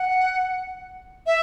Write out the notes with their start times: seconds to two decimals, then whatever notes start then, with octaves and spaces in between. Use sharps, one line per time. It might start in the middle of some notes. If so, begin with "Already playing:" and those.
Already playing: F#5
1.27 E5